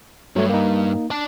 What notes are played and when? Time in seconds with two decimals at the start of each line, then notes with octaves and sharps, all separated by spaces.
0.36 G2 F#3 A3 C#5
0.49 A#3 D#4
1.11 D5 A5